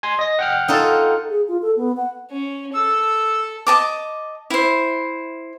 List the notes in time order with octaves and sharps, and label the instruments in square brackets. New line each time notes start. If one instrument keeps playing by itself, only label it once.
[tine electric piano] G#5 C6
D#5 A#6
F#5 G5 F6
[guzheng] D#4 F4 A4
[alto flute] G#4
F4
A4
B3
F#5
[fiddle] C#4
[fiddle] A4 [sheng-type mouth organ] E6
[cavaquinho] D#5 A5 D6
E4 C5